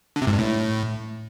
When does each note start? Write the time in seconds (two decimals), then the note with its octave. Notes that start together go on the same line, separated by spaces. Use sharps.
0.16 D3
0.22 C3
0.27 G#2
0.33 G2
0.39 A2